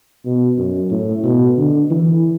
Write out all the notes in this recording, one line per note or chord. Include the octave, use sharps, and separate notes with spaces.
B2
F#2
A2
B2
D3
E3